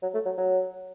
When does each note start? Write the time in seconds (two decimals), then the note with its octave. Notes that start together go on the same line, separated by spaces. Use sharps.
0.02 F#3
0.14 A3
0.25 F#3
0.38 F#3